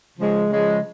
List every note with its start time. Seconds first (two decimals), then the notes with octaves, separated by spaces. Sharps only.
0.18 C#3 F3 G#3
0.49 C#3 F3 G#3